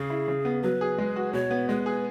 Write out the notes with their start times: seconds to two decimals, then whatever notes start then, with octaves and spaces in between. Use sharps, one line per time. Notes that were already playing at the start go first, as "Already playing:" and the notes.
Already playing: C#3 G#4
0.10 E4
0.28 C#3
0.45 B3
0.62 F#3 B4
0.81 G#4
0.98 G#3
1.16 F#4
1.33 B2 C#5
1.51 B3
1.69 G#3 B4
1.86 G#4